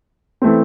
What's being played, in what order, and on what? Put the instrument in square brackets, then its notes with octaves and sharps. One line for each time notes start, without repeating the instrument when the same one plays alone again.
[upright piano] E3 A3 C4